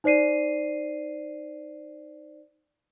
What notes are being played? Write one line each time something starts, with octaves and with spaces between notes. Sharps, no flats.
D#4 C5 D5 C7 D#7